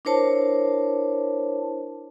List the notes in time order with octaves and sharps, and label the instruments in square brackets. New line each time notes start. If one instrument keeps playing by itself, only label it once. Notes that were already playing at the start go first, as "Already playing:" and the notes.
[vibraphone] D4 E4 A#4 C5 C#5 A5